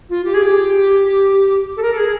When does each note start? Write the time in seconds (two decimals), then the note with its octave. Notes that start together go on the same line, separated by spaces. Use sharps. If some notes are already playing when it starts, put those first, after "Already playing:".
0.10 F4
0.25 G4
0.34 G#4
0.42 G4
1.77 A4
1.82 A#4
1.92 A4
1.97 G#4